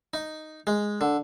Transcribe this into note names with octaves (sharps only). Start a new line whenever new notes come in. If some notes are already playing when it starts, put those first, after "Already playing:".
D#4
G#3
D3